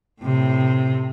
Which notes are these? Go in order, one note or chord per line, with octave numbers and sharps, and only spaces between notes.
A2 C3